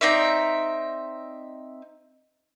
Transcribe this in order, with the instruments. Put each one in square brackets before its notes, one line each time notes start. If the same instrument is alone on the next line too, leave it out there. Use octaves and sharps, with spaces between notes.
[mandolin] C4 D#4 D5 E5